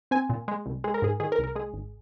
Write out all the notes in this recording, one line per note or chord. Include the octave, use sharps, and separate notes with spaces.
C4 G#5
A#2
G#3
C2
G#3 G#4
A#4
G#2 G#4
D#3 G#4
A#4
C2
A#4
G#3 G#4
G#1